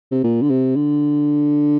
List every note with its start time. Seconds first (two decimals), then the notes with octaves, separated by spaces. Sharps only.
0.12 C3
0.24 A#2
0.42 D3
0.50 C3
0.76 D3